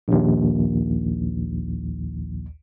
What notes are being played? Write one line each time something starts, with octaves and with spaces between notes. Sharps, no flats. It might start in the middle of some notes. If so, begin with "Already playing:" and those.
A#1 D#2